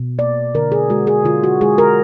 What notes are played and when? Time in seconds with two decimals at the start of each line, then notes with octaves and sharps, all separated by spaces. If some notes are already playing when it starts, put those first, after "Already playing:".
Already playing: B2
0.18 A#3 D5
0.55 D3 A#4
0.72 G#4
0.90 G#3 F#4
1.07 G#4
1.25 D3 F4
1.44 F#4
1.61 G#3 G#4
1.78 A#4